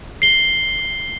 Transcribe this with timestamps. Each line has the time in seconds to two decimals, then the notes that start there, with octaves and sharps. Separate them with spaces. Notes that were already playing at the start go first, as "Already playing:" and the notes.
0.22 C7 G7